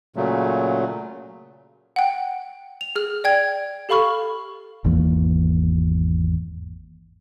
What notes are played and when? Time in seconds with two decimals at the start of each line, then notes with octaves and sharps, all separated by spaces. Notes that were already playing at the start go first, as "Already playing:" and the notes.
0.16 A#2 C#3 F#3 A3
1.96 F#5 G5
2.81 F7
2.96 G#4 F6
3.24 D5 G5 G#6
3.89 G4 A4 F5 B5 C#6 F6
4.84 G#1 E2 E3 A#3